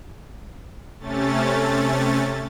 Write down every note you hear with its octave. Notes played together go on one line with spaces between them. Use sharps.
C3 A3 C#4 A6